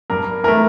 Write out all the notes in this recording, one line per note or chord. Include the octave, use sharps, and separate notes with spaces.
G2 A#4
E3 A3 A#4